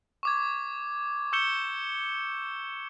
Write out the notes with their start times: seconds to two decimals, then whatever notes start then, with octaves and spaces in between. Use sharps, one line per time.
0.23 C#6 D6 G#6
1.32 C#6 E6 G6 C#7 E7 G7